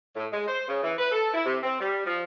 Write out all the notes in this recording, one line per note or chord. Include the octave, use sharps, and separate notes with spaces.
A2
G#3
C5
C#3
E3
B4
A4
E4
C3
C4
G3
F3